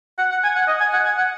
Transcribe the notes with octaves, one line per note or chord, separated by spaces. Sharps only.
F#5
F#5
G#5
F#5
D#5
G#5
F#5
G#5
F#5